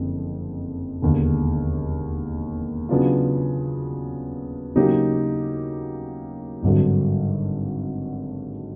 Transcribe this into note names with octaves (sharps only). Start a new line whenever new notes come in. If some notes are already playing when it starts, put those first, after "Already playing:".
Already playing: F#1 F2 D3
E1 D#2 D3
C#3 F#3 B3 D4 F4
C#3 F#3 A#3 D#4 G4
G#1 G2 D3 F#3